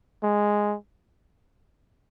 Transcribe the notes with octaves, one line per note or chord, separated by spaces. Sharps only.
G#3